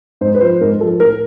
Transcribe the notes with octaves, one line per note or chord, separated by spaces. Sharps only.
G#2 C5
B4
F3 C5
G#2 A#4
F3 A4
A2 A#4